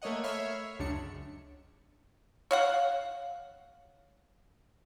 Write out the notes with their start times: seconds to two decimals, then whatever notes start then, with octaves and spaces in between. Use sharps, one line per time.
0.02 A3 A#3 C#5 D#5 F#5
0.24 C#5 E5 B5 F6 C7
0.79 C#2 F#2 D4 C#7
2.51 C#5 F5 F#5